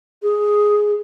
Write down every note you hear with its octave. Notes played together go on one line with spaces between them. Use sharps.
G#4